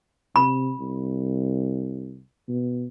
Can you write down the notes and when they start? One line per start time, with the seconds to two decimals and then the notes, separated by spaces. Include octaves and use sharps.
0.36 C3 B5
0.79 C2
2.48 B2